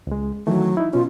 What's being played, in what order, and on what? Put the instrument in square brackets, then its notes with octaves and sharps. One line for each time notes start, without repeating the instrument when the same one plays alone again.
[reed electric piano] C#2 G#3
[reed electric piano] D#3 E3 A3 [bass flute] F#3
[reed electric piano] D#4 E4
[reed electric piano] B2 C#4 [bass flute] F4